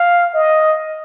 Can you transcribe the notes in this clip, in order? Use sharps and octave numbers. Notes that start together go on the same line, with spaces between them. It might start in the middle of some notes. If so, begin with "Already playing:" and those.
Already playing: F5
D#5